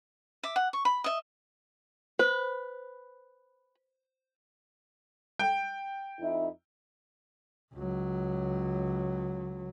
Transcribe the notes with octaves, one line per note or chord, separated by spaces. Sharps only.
E5 D6
F#5
C#6
B5
D#5 E5
B4 C5
G5
F2 D#4 E4
C#2 F#3